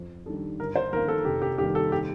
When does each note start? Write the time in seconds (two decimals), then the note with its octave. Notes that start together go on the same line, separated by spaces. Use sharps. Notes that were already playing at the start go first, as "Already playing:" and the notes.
Already playing: F2
0.26 D#3 G3 D4 A4
0.60 G1 A#4
0.76 C5
0.93 F2 D#3 A#3 F4 A#4
1.08 A4
1.25 F1 G4
1.42 G4
1.58 D#2 D#3 G3 A#3 G4
1.75 A4
1.92 G4